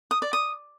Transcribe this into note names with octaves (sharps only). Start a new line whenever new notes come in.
D#6
D5
D#6